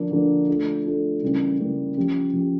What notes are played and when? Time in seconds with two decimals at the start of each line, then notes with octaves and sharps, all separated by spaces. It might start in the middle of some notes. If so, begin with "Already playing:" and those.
Already playing: D3 F3 A#3 D4
0.11 D3 F3 A#3 D4
0.48 A3 D4 F4 A4
0.85 A3 D4 F4 A4
1.22 C#3 E3 G3 A#3 C#4
1.60 C#3 E3 G3 A#3 C#4
1.97 F3 C#4 G4
2.33 F3 C#4 G4